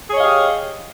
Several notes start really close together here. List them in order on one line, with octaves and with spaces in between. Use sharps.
G#4 C#5 D#5 F5 G4